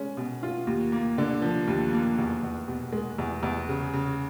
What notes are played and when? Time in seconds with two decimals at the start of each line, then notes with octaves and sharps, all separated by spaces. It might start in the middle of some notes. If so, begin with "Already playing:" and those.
Already playing: G#3 C#4
0.17 B2
0.43 F4
0.67 D#2
0.92 A#3
1.18 D3
1.42 F3
1.68 D#2
1.93 A#3
2.18 E2
2.43 E2
2.68 B2
2.92 G#3
3.18 E2
3.43 E2
3.69 C#3
3.93 C#3